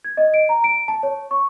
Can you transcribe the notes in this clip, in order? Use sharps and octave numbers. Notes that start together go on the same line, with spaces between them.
G#6
D#5
D7
A#5
D7
A5
C#5
C#6